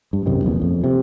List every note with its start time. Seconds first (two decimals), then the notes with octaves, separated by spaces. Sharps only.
0.13 G2
0.26 C2 F#2 C3 D#3
0.44 D1 A#1 E2
0.62 F2
0.84 C3